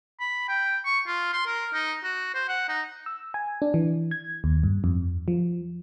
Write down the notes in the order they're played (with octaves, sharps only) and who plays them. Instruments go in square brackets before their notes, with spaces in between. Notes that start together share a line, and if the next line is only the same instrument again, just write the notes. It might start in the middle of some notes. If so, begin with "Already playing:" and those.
[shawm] B5
G5
C#6
F4
C6
A#4
D#4
F#4
C5
F#5
D#4
[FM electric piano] E6
G#5
D4
E3
G#6
D#2
G2
F2
F3